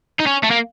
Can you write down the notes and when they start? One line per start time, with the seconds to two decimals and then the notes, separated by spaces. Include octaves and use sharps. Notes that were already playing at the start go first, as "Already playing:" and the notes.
0.20 D#4
0.27 C#4
0.44 A3
0.51 A#3